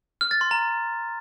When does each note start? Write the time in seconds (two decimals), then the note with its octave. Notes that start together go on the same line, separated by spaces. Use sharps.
0.21 F6
0.31 A6
0.41 C6
0.51 A#5